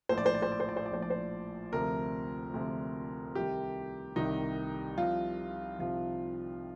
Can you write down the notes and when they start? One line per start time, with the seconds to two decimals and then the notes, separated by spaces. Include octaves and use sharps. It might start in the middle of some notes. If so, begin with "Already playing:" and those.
0.09 A#1 A2 F3 C5
0.18 D5
0.26 C5
0.35 D5
0.42 C5
0.52 D5
0.60 C5
0.69 D5
0.77 C5
0.86 D5
0.91 A#1 A2 F3 C5
1.02 D5
1.10 C5
1.72 D2 C3 F3 A#4
2.54 D2 C3 F3
3.35 C2 C3 D#3 G4
4.16 C2 C3 D#3 D#4
4.98 C2 C3 F3 F4
5.79 C2 C3 F3 F4